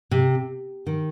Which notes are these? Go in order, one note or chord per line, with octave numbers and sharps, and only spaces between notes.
C3
D#3